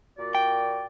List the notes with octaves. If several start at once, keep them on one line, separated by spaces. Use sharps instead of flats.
A#2 F#4 D5
G5